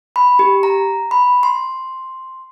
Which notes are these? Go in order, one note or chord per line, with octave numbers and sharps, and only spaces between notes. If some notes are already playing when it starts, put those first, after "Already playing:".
B5
G4
A#5
B5
C6